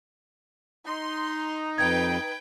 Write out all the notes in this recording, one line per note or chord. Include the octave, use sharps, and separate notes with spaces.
D#4 C6
F2 B4 G5 G#6